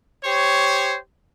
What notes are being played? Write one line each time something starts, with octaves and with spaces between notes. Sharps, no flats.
G4 C5 C#5